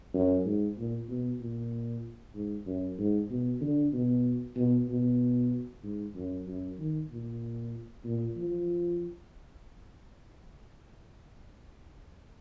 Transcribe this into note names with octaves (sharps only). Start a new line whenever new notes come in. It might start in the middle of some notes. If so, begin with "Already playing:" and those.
F#2
G#2
A#2
B2
A#2
G#2
F#2
G#2
B2
D3
B2
B2
B2
G#2
F#2
F#2
D#3
A#2
A#2
F3